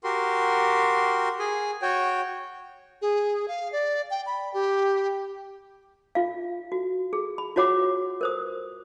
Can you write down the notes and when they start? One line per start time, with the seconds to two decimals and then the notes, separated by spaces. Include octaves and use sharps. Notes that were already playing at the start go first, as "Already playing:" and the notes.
0.04 F#4 G4 A#4 C6
1.39 G#4 G#5
1.82 F#4 C#5 G5
3.02 G#4
3.48 F5
3.72 D5
4.10 G5
4.26 B5
4.54 G4
6.15 F4 F5
6.72 F#4
7.13 G#4
7.38 B5
7.56 F4 F#4 C#5 F#5 D6
8.21 A#4 C5 D#6